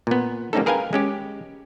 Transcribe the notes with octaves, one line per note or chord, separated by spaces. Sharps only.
A#2 B3
G3 A#3 C4 C#4 D#4 A4
G#4 A#4 B4 F5 G5 G#5
G#3 C#4 G4